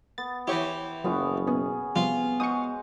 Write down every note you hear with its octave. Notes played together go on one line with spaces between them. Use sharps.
B3 A6
E3 E4 G4 C5 C#5 G5
F#1 F#3 B3 C#4 F4
B2 B3 C#4 G#4
C3 F3 G3 B3 F4
G#3 F#4 C5 C#6 D#6